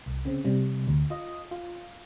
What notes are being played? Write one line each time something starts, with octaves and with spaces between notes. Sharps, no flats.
C2
C#3 C4
C3 G3
D2
F4 D#5
F4